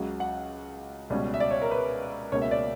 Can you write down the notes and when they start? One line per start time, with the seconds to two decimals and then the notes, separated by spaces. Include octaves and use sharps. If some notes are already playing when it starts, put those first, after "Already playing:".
Already playing: C#2 C#3 F#3
0.20 F#5
1.10 C#2 B2 G3 C#4
1.34 E5
1.40 D5
1.51 C#5
1.61 A#4
1.71 B4
2.32 C#2 B2 A#3 C#5
2.42 E5
2.51 D5